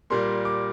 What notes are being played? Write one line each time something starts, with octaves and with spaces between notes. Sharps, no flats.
A#2 G3 A#3 C6
D6